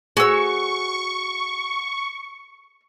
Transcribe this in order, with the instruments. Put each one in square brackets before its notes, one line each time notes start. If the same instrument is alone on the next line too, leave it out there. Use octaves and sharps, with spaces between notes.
[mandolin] F#4 E6 [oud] G#4 C#5 [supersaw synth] C#6